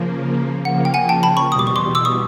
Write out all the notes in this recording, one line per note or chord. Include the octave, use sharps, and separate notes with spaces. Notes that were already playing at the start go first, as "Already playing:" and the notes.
Already playing: C#3 F3 A#3
C#3 F3 A#3 F#5
G5
F#5 G#5
G5 A5
A5 B5
B5 C#6
E2 B2 G3 D#6
D6
C#6
C6 D6
D6 E6
C#6 D#6